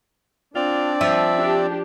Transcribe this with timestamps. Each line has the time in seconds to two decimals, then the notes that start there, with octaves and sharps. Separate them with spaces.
0.55 C4 D4 F4 D5
1.01 F3 E5
1.36 D4 G4